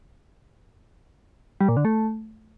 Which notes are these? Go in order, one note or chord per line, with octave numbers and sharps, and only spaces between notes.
G3
A#2
D3
A3